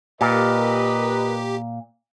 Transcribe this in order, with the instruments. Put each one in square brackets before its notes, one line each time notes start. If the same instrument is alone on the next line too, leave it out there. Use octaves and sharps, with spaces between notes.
[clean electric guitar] A#2 [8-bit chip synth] G4 [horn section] A#4 B4 D#5